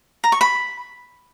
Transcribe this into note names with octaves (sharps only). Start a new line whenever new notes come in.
A#5
C#6
B5